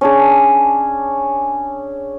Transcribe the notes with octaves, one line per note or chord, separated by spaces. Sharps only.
C#4 D4 G#4